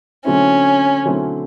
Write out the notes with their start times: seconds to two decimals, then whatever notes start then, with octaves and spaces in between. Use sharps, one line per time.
0.25 D3 F#3 A3 C4 C#4 E4
1.05 D3 F#3 A3 C4 E4